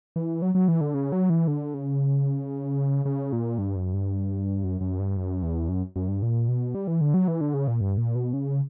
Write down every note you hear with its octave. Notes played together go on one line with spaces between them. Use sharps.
E3
F#3
F#3
E3
D3
C#3
F#3
E3
D3
C#3
C#3
A#2
G2
F#2
G2
F#2
F#2
G2
F#2
E2
F#2
F#2
G2
A#2
B2
G3
E3
D3
F#3
E3
D3
C#3
A#2
G2
A#2
B2
C#3